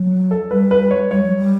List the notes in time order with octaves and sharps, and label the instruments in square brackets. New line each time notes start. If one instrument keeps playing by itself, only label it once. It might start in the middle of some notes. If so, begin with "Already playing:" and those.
Already playing: [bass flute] F#3
[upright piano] A4
[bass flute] G3 [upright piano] B4
[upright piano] B4
C#5
[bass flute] G3 [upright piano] C#5
[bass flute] F#3
G3